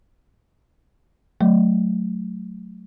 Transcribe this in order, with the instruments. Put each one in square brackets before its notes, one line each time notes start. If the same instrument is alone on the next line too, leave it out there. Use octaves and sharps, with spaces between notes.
[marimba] F#3 A3